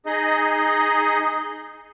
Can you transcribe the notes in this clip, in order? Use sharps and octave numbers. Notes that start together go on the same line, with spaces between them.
D#4 G#4 D#5